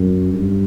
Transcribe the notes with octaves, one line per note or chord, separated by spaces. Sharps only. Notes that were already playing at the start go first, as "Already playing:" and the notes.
Already playing: F#2
G2